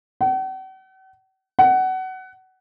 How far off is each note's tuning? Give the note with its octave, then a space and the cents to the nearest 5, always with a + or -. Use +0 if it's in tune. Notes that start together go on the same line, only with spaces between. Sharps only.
F#5 +45
F#5 +20